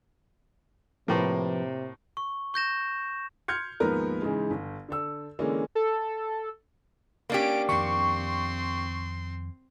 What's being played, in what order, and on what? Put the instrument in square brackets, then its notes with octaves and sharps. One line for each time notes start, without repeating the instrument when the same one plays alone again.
[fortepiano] A2 A#3 [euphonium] C3 [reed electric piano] F3 B4
[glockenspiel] C#6
C#6 G6 A#6 E7
[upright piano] C6 F6 G6 G#6 C#7
D#2 G#2 F3 B3 A#4 B4
G#2 C#3 E3 G#3
G1
D3 A4 E6
D3 E3 G#3 A#3 C#4
[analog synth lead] A4
[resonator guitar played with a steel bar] A#3 D4 G4 [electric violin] C#4 D7
[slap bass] F2 D#3 [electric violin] C4 C6 [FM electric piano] C#6